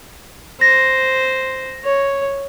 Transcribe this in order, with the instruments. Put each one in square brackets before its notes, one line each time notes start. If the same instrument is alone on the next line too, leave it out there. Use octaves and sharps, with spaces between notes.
[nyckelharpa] C5 [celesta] A#6
[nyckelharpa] C#5